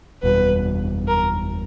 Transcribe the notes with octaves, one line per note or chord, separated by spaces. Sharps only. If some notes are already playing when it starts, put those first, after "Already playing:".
F#1 E2 B2 G3 B4
A#4